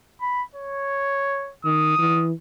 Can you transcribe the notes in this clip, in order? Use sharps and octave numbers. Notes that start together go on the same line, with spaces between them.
B5
C#5
D#3 D#6
E3